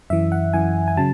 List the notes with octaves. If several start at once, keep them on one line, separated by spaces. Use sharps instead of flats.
F#2 E3 E5
F#5
F#2 E3 G#5
G#5
C#3 F#3 A5